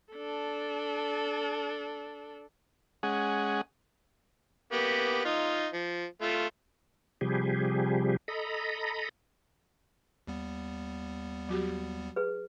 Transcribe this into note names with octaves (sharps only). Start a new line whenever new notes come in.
D4 A4
G#3 C#4 G#4 F#5
A#3 B3 G4
D#4 F4
F3
A3 F4
C3 F3 G3 G4 G#4
A4 D#5 A#5 B5
D#2 G3 B3
F#3 F#4 G4
G#4 B4